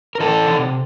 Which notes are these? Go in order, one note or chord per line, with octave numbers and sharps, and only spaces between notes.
A#4
E3 A4
C3